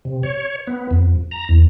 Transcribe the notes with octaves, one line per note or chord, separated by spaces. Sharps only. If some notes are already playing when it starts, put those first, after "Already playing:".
C3
C#5
B3
F2
A#5
E2